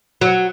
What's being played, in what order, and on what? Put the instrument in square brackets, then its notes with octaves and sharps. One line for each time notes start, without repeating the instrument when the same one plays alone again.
[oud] F#3